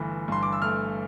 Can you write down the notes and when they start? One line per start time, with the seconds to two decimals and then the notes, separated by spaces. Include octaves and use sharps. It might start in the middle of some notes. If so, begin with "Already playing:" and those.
Already playing: G1 E3 A3
0.28 G2 C6
0.43 D6
0.52 E6
0.62 A3 F6